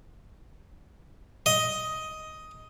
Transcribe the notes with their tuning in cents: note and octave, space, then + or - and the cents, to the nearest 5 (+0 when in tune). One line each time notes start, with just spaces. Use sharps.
D#5 +10